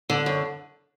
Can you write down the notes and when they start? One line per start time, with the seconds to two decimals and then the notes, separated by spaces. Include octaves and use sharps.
0.10 D3
0.26 F#2